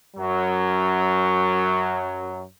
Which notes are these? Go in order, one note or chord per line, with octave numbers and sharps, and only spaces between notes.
F#2 F#3